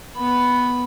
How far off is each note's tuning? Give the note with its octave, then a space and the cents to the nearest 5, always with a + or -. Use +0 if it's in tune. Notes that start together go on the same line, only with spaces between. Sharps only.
B3 +0 B5 +0